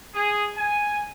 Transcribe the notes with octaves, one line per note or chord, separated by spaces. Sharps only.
G#4
G#5